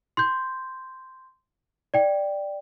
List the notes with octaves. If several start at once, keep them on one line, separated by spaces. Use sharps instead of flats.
C6 G6
D5 G5